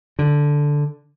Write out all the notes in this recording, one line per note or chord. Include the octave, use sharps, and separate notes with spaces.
D3